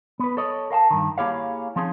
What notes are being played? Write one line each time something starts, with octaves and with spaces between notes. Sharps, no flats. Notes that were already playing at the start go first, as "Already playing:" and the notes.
B3 B4
A4 C#5 D#5
A#4 F5 G5 A5
G2 D#3
A#3 E4 G4 G#4 C#5 F5
F3 C4 C#4 D#4 G#4